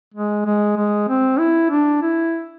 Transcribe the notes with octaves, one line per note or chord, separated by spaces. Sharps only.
G#3
G#3
G#3
C4
E4
D4
E4